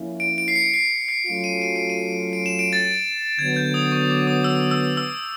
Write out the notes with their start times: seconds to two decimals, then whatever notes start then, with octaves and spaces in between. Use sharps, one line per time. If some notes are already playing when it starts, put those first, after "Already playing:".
Already playing: F3 A#3 C#4 E4
0.20 D7
0.38 D7
0.48 C7
0.56 C#7
0.74 C7
1.08 C7
1.26 F#3 A3 C#4 F4 D7
1.44 D#7
1.62 D#7
1.76 D7
1.90 D#7
2.33 D7
2.46 E7
2.59 D7
2.73 A6
3.38 D3 F#3 B3 G#6
3.56 G6
3.74 D#6
3.92 C#6
4.10 D6
4.27 D#6
4.44 E6
4.71 E6
4.97 E6